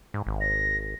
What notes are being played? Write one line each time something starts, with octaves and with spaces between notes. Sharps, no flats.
G#2
G#1
A#6